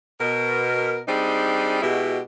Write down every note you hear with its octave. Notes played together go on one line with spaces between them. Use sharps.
B2 A#4
G3 C4 D4 D#4 G#4
B2 G#3 E4 F#4 G4